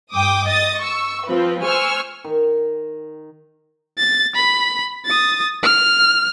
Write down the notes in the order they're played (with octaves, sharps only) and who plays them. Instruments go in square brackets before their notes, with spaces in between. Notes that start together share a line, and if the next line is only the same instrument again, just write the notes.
[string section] G2 G5 D6 D#6
D#5 D#6 A6
C#6 E6
F3 C4 F4 B4
C5 G#5 C#6 E6 F6
[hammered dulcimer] D#3
[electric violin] A6
B5
D#6 A6
F6